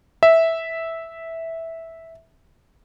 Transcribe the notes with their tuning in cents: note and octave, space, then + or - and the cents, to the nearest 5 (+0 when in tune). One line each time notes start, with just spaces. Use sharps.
E5 -10